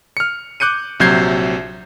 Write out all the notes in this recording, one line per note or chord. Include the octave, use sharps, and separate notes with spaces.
F6 C#7
D6 F#6 G6 C#7 D#7
A#1 C3 F#3 G6 G#6 C7